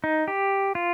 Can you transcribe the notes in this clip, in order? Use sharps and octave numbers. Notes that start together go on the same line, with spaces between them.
D#4
G4
F4